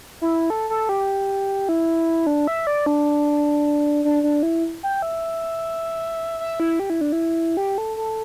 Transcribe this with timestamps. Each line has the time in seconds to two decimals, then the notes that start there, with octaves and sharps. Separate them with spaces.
0.21 E4
0.50 A4
0.70 A4
0.89 G4
1.69 E4
2.27 D4
2.47 E5
2.67 D5
2.86 D4
4.05 D4
4.23 D4
4.43 E4
4.83 G5
5.02 E5
6.40 E5
6.60 E4
6.80 G4
6.90 E4
7.01 D4
7.12 E4
7.57 G4
7.78 A4
7.97 A4